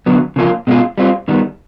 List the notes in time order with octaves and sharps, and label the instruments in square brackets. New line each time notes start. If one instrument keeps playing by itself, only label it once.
[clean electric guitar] D3 F#3 B3
C#3 F3 A#3 C#4 F4
B2 G#3 C#4 F4
G3 C4 F4
D#3 G3 B3